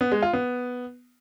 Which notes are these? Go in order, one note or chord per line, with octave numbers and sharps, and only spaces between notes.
B3
G#3
F4
B3